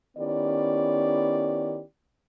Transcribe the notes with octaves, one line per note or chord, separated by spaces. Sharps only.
D#3 B3 C#4 E4 G4 D5